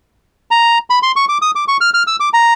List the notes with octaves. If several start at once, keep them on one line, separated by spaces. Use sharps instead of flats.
A#5
B5
C6
C#6
D6
D#6
D6
C#6
F6
F6
E6
D6
A#5